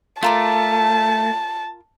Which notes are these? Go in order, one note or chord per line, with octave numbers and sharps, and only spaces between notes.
A3 F4 A#4 A5 D6